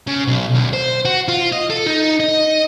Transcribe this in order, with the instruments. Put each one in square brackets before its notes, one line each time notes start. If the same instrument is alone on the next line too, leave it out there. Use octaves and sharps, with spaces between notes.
[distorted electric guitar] C#3
B1
D2
C5
F#4
F4
D#5
A4
D#4
D#5